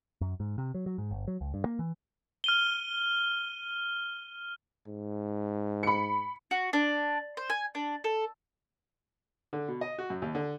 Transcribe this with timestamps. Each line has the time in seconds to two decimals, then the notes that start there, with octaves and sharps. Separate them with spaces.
0.21 F#2
0.40 G#2
0.58 C3
0.74 F#3
0.86 F#3
0.98 G#2
1.11 G1
1.27 F#3
1.41 C#2
1.54 G2
1.65 A#3
1.79 E3
2.44 F6 D#7 G7
4.87 G#2
5.83 B5 C#7
6.51 F#4
6.73 D4
7.37 C5
7.50 G#5
7.75 D4
8.04 A4
9.53 D3
9.68 B2
9.81 D#5
9.98 F#4
10.10 F#2
10.22 D#2
10.35 D3